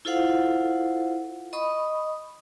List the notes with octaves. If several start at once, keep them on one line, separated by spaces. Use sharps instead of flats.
E4 F4 A4 C5 F5 F#5
D#5 B5 C#6 D#6